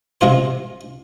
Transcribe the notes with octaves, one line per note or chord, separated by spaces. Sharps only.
C3 G#3 F4 C5